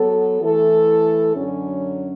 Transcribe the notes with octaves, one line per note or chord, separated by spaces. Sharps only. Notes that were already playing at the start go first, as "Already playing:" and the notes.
Already playing: F#3 B3 F#4 A4
E3 A3 E4 A4
F#2 D3 F#3 C#4